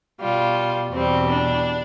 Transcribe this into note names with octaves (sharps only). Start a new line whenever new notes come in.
B2 G3 F4
E2 B2 G3 C4
D4